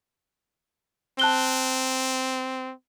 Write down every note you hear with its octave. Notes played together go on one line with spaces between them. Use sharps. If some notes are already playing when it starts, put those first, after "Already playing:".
C4 A5 F#6 G7